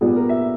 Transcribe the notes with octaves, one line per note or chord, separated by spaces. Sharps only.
A#2 G3 B3 G#4
A#4
E5